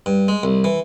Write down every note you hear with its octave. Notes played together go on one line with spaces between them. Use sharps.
G2
G#3
C2
E3